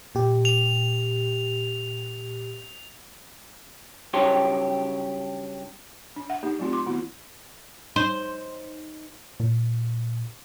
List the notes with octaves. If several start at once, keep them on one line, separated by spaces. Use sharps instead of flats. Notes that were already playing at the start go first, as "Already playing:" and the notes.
A#2 G4
F7
G2 C#3 F#3 G4 C#5 C6
D4
E5 F#5
A#3 D#4 G4
F#3 A3 C4 F4 G4
C6 D6
D#3 B3 E4 F#4
D#4 C5
A#2